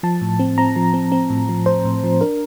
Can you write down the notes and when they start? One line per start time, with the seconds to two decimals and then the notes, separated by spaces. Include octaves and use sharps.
0.03 F3 A5
0.21 A2
0.39 C4
0.58 C4 A#5
0.76 F3
0.94 C4
1.12 C4
1.30 A2
1.49 F3
1.66 A2 C5
1.85 A2
2.03 F3
2.21 D4 A#4